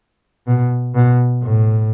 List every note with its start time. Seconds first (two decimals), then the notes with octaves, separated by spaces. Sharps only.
0.47 B2
0.95 B2
1.43 A2